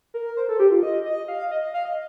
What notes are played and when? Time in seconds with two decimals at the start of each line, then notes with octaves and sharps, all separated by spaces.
0.14 A#4
0.37 C5
0.49 A4
0.60 G4
0.71 F4
0.83 D#5
1.05 D#5
1.28 F5
1.51 D#5
1.74 F5
1.85 D#5